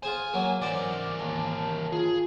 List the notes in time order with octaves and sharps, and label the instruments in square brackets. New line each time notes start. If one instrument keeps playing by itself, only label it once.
[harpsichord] F4 G#4 C5 [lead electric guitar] G#5
[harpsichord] F#3 A#3
[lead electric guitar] E3 A#4 [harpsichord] C5 D5 [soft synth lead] D6
[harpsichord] D#2 [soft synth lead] A5
[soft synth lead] F4 [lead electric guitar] G#4